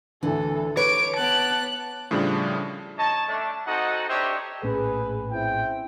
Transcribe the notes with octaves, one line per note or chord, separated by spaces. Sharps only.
D2 A2 D3 E3 A4
B4 C#5 D6 D7
B3 A5 F#6
A2 C#3 F3 G3 D4
D#4 C#5 D#5 A5
A3 D4
C4 D#4 F#4 A4 D#5 F#5
D4 G4 C5 C#5 D#5 E5
A#1 A2 C#4 G#4 B4
C4 E4 G5